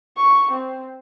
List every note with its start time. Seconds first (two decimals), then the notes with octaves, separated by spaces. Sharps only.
0.17 C#6
0.51 C4